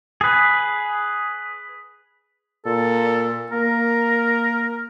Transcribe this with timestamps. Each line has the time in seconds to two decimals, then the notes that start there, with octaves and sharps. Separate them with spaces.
0.21 G#4 B4
2.66 A#2 A4
3.52 A#3 A#4